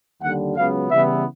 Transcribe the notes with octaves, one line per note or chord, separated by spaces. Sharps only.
D#2 D3 G3 F#5
C#2 C#3 F#3 B3 F5
C#3 E3 G3 B3 E4 E5